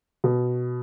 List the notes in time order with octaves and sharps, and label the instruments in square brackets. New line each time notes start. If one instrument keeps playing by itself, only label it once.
[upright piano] B2